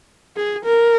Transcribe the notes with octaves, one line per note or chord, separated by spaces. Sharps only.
G#4
A#4